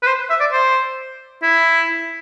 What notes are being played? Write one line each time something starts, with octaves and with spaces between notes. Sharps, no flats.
B4
C5
E5
D5
C5
E4